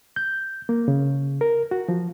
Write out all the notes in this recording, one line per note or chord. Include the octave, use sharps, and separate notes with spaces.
G6
A#3
C#3
A#4
F#4
F3